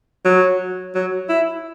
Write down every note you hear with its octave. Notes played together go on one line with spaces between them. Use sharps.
F#3
F#3
E4